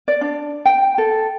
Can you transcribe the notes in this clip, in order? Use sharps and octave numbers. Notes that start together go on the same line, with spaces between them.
D5
D4
G5
A4